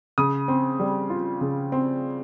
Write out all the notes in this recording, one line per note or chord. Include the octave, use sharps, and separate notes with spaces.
C#3 D#6
C4
G3
F4
C#3
C4